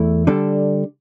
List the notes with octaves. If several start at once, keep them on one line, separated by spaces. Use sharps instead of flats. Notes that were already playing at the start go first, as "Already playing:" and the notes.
Already playing: E2 A3 E4
D3 G3 D4 A4